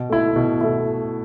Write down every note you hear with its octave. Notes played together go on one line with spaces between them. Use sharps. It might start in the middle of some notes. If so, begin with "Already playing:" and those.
Already playing: B2
A3 E4
B2
A3 E4